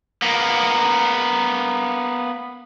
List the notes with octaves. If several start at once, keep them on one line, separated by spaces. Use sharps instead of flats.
A#3 B3